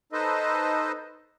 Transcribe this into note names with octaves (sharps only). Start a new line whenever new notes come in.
D#4 A4 B4 C5 D#5